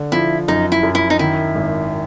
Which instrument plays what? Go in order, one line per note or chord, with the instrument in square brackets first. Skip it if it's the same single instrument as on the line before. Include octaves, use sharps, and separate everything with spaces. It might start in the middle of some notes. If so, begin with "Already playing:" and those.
Already playing: [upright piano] D3
[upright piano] F3 [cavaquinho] E4
[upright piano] F#2 [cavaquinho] D#4
[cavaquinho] E4
[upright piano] F#2
[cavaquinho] E4
D#4
[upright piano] D#3 [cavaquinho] E4
[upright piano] G#1